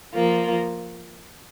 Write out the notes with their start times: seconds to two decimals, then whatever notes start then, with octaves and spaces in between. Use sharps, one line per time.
0.13 F3 A#3 F4